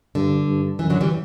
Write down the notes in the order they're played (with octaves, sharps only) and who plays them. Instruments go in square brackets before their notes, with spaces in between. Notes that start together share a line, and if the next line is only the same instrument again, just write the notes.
[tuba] G2 [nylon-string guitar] D3
[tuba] G2
[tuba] F#2 [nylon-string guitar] E3
[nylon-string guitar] D3 F#3
E3 G3